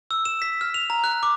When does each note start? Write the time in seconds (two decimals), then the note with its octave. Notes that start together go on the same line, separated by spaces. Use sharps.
0.11 E6
0.25 E7
0.42 B6
0.61 F6
0.74 F7
0.90 A#5
1.04 F#6
1.23 D6